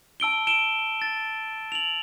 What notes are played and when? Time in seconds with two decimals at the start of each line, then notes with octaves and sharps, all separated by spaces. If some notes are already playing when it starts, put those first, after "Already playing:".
0.20 A5 E6 D7 G7
0.47 D7 E7 G7
1.02 A6
1.72 F7 F#7